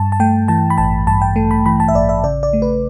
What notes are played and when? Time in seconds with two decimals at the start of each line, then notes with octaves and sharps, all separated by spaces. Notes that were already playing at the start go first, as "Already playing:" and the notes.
Already playing: G2 A5
0.12 A5
0.20 A3 G5
0.48 E3 A5
0.70 B5
0.78 A1 A5
1.07 G2 A5
1.22 G5
1.36 A3
1.51 B5
1.66 E3 B5
1.80 A5
1.88 E5
1.94 A1 D5
2.09 E5
2.24 C#3 D5
2.43 D5
2.53 A3
2.62 B4